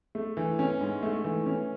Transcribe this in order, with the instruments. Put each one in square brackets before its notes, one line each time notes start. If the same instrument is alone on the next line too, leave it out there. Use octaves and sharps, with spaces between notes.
[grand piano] A3
E3
C#4
G#2
A3
E3
C#4